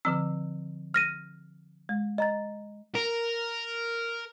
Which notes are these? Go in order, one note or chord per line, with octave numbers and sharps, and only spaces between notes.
D3 F3 C4 E6
F6 A#6 D#7
G#3
D#5 A#5 A6
A#4